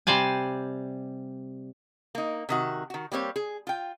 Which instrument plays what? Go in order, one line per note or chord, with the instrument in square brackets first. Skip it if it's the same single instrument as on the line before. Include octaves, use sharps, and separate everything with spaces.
[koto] C3 G3 C5 D5 G#5
[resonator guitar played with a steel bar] A#3 D#4
C3 D#3 F#4
D#3 F#4
G3 A#3 C4 C#5
G#4
F4 G5